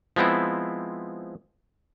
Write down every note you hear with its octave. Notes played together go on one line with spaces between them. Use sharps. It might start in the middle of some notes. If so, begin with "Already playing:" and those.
F3 G#3 B3 C4 E4